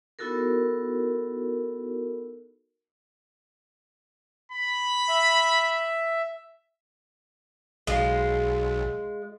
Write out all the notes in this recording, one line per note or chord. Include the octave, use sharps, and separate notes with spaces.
B3 D#4 E4 F#4 A4 A#4
B5
E5
B1 G#3 F4